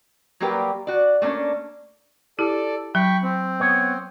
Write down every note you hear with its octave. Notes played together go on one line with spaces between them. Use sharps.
F#3 G3 A#3 G4 A#4 B4
F#4 D5
A3 A#3 C#4 D4
E4 G4 A4 D5
F#3 G5 B5 C#6
C4
B3 C#5